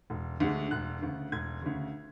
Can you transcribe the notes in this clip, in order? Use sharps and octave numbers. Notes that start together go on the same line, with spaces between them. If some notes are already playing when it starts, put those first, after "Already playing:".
E1
D2 D3 G#3
E1 F#6
D2 C#3
E1 G#6
D2 C#3